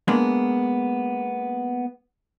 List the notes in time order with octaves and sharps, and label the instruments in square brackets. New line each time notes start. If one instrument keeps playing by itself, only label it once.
[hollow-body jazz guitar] G#3 A#3 B3 D4